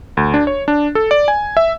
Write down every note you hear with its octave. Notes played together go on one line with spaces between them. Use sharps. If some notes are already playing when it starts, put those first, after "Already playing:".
D2
D4
C#5
D4
A4
D5
G#5
E5